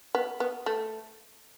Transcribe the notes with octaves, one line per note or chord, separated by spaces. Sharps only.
B3
B3
A3